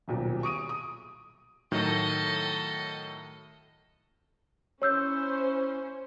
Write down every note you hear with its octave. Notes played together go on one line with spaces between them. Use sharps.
D#1 B1 A#2
C#6 D#6 D7 D#7
D#6
A2 D#3 F#3 A4 D#5
C#4 E4 C5 C#5 E6 G6